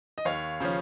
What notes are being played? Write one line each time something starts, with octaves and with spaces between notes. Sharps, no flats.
D#5
D#2 C#5 F5
C#3 F3 C#4